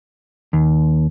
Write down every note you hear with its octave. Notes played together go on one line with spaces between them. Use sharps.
D#2